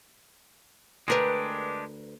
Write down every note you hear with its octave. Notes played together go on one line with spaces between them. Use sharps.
D2 G#3 D4 G4 A#4 B4